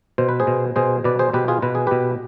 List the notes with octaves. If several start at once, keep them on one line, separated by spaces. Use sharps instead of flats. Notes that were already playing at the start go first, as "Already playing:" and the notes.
B2 C5
B4
G#4 C5
B2
B2 G#4 C5
B2 B4 D5
G#4 C5
B2 G4 B4
F4 G#4
B2 B4
G#4
B2 G4 B4